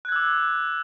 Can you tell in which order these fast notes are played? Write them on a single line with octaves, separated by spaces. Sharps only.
F#6 G#6 E6 D6